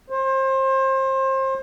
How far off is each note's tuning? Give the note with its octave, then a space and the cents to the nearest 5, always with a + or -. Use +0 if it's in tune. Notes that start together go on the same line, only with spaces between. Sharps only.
C5 +30